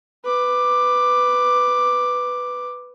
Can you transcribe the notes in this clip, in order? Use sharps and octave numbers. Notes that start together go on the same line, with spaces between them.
B4 D6